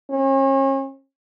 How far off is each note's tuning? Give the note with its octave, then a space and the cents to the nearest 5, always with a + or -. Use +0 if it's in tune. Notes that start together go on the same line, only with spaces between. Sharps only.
C#4 -40